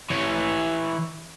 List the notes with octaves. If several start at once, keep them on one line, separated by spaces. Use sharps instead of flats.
E3 C#5